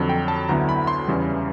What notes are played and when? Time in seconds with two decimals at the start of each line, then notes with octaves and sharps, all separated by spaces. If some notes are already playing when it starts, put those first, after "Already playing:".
Already playing: F2 D3 F#3
0.09 G5
0.28 A5
0.48 D2 D3 F#3 B3 E4 A#5
0.69 B5
0.87 C6
1.07 E2 C#3 E3 G3